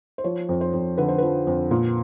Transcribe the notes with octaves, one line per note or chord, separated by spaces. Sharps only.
C5
F3 C#5
F2
C5
F2
D3 B4
C5
F3 B4
F2
A#2